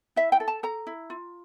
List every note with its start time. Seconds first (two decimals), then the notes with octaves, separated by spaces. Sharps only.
0.16 E4 E5
0.32 G5
0.40 A4
0.48 A5
0.63 A4 A#5
0.87 E4
1.10 F4